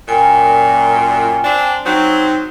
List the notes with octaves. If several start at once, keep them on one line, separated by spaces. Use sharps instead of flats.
F#2 A#2 G5 G#5
C4 D4
F#3 C4 D#4 G5